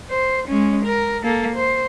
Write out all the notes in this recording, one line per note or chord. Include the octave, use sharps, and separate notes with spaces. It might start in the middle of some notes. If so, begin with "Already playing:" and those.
C5
G#3 C#4
A#4
A#3 A4
C5